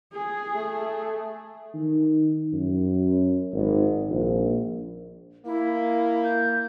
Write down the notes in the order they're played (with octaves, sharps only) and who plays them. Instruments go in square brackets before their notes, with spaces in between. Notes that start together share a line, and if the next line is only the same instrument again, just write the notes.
[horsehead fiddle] G#4
[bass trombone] A3
[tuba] D#3
F#2
G#1
A#1
[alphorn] A#3 [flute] E4
[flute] G6